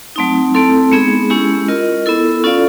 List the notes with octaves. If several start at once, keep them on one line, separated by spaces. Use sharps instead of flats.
F#3 A3 C4 D#4
A3 C4 E4 A4
G#3 B3 D#4 G#4
G#3 C#4 E4 G4
F4 A#4 D#5
B3 E4 A4
C#4 F4 A4 D5 F5